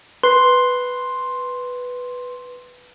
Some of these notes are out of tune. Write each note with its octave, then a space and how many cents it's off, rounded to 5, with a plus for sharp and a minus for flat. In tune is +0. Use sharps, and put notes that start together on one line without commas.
B4 +0 C6 +5